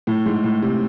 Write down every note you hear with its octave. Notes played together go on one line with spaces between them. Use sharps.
A2
G#2
A2
C3